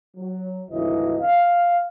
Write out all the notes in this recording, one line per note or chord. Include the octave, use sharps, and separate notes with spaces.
F#3
G#1 D2 C#3 E3 F#3 D#5
F5